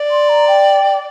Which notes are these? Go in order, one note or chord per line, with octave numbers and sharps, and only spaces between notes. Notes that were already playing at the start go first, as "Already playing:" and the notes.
Already playing: D5
C6
A#5
G5